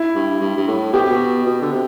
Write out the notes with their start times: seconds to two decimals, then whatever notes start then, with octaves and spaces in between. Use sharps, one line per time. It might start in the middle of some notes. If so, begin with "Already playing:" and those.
Already playing: E4
0.15 G2
0.41 G2
0.57 G2
0.68 A2
0.93 B2 G4
1.02 C3
1.09 B2
1.46 B2
1.62 D3
1.72 C3